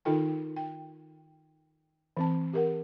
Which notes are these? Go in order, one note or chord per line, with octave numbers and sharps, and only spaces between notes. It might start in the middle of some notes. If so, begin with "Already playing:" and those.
D#3 D#4 F4 A4 G5
G5
E3 C4 A5
G4 A#4 F#5